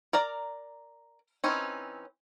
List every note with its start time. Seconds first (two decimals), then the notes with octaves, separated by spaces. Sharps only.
0.13 A#4 D5 A#5
1.44 E3 C4 C#4 D#4